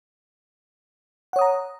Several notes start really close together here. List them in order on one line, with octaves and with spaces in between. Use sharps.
F#5 C#5 D#6 A#5